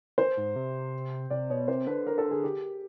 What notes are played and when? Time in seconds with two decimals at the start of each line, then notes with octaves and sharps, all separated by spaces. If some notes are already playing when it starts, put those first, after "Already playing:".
0.18 C5
0.37 G#2
0.56 C3
1.30 C3 D5
1.50 B2 C#5
1.68 C3 C5
1.87 D3 B4
2.07 A#4
2.18 A4
2.31 G#4
2.44 G4